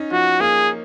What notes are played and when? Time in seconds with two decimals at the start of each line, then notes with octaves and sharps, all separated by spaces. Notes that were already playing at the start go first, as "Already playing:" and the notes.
Already playing: C#4 D#4
0.11 F3 F#4
0.40 A#3 G#4